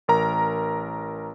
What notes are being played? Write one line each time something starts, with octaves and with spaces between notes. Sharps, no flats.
A1 A#4 A#5